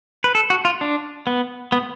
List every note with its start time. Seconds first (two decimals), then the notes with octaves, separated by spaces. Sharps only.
0.24 B4
0.35 A4
0.50 F#4
0.65 F4
0.81 D4
1.27 B3
1.72 B3